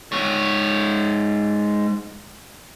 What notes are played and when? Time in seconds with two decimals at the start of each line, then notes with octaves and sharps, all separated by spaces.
0.12 G#2 C#5